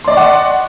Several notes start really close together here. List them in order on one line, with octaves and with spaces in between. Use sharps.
C6 D5 D#5 C#6 F#5